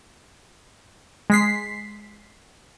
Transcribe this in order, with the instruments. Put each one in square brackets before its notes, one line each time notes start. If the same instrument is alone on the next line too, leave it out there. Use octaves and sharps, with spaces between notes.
[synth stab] G#3 B6 C7